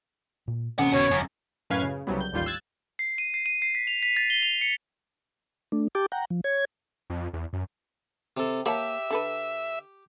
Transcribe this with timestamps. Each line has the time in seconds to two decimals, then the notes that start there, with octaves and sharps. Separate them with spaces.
0.48 A#2
0.79 C3 E3 A#3 C4 C#4 F#5
0.92 F1 B2 D3 E3 C#5
1.11 F#2
1.70 F#2 A2 C#4 B4 F5 G#6
1.83 C#3
2.07 C2 C#3 F#3 G3 B3
2.21 G6
2.33 A1 D#2 G3 F4 G6 C7
2.46 E6 F#6 G#6 A6
2.99 C7
3.18 D#7
3.34 C7
3.46 D#7
3.62 C7
3.75 B6
3.87 F7
4.03 B6
4.17 A6
4.30 G7
4.43 F7
4.61 C#7
5.72 A3 D4
5.95 G4 G5 A5 D6
6.12 F#5 G5 A#5
6.30 F3
6.44 C#5 G#6
7.10 F2
7.33 E2
7.53 F#2
8.37 C3 A4
8.66 A#3 G4 C#5 E5 A5
9.10 D3 A4 B4